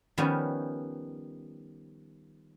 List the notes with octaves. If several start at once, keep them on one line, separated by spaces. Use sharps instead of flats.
D#3 F3 G3 B3 C#4